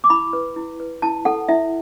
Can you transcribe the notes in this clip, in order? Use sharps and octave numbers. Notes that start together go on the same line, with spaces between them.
D6
E4 B5
B4
E4
B4
E4 A5
A4 F#5
E4 E5